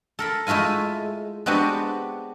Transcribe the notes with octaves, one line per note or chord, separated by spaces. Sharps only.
A4 A#4 B5
G#3 A3 E4 F4 G#5
G#3 B3 C4 D4 F#4 G4